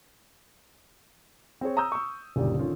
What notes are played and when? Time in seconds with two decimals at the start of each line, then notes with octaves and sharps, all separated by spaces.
1.61 C4 G#4 C#5
1.77 A#5 D#6 E6 G6
1.92 C#6 E6
2.36 F#1 D2 A#2 G3 G4 D5
2.59 D3 D#3 C#4 F4